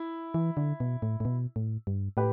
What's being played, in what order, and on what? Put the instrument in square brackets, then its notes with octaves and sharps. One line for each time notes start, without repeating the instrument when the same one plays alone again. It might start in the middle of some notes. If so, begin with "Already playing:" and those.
Already playing: [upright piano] E4
[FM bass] E3
D3
B2
A2
A2
B2
A2
G2
[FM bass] A2 [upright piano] G4 B4